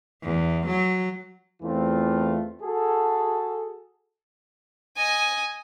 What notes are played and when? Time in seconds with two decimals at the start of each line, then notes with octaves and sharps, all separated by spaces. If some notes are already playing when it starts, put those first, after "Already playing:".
0.23 E2
0.67 F#3
1.62 E2 E3 A3 C4 F4
2.61 F#4 G#4 A4
4.96 D#5 G#5